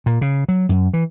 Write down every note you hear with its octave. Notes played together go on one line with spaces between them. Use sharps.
A#2
C#3
F#3
F#2
E3